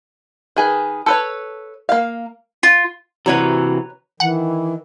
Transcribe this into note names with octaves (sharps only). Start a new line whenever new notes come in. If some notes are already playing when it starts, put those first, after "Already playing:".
D#3 G#4 B4
A4 B4 C#5
A#3 F5
F4
C3 E3 F#4 B4 C#5 A#5
D#3 E3 F#5